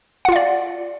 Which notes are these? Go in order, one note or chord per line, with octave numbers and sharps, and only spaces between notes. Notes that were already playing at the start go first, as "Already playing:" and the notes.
F4 D5 F5 F#5